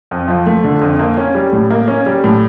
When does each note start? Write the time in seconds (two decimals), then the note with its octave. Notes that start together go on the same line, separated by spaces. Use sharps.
0.11 F2
0.28 F3
0.46 A3
0.64 D3
0.81 F2
0.99 A#3
1.17 C#4
1.35 G3
1.53 A2
1.70 A#3
1.88 C#4
2.06 G3
2.24 A2